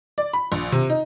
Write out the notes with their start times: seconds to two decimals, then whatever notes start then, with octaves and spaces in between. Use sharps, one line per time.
0.18 D5
0.33 B5
0.52 A#1
0.72 C3
0.90 D#4